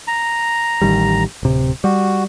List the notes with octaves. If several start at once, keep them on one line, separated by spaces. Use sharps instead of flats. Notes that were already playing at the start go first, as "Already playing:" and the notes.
A#5
A1 D#3 G3
D1 C3
G3 F#4